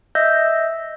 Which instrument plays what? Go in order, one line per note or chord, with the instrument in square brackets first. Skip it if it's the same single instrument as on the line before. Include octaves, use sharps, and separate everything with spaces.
[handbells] D#5 E5 E6 G6 A#6